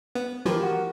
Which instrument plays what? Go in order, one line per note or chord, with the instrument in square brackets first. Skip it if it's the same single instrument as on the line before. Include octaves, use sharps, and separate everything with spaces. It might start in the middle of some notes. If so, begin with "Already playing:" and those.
[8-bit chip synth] B3
[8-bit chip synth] E3 F3 [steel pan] G4 A#4
[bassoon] F#4